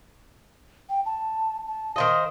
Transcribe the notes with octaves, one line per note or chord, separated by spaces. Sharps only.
G5
A5
A5
D#3 C5 D#5 F5